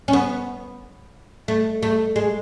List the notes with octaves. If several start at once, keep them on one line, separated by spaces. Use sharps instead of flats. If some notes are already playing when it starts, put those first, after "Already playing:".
C#4
B3
A3
A3
G#3